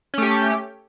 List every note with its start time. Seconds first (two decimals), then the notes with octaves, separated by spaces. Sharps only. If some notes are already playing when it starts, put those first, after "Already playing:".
0.14 C#4
0.18 A3
0.22 G4